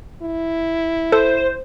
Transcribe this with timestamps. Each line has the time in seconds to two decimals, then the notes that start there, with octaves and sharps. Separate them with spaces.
0.23 E4
1.12 A4 C5